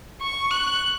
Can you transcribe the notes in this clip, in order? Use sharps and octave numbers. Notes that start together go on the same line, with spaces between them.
C#6
F#6